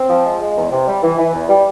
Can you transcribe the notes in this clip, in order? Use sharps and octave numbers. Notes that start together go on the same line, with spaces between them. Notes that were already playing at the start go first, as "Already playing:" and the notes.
Already playing: C4
F3
G#3
G#3
E2
C3
G3
E3
E3
E2
G3